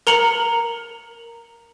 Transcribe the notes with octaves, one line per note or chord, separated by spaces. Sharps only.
A#4 A#5 C#7 F#7